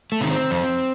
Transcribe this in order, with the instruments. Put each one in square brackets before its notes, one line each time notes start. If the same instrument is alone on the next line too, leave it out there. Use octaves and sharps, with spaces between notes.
[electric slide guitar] A3
C3 D#3
C4
F2